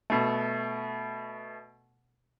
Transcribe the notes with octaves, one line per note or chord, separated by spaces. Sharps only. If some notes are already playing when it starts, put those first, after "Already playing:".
B2 A3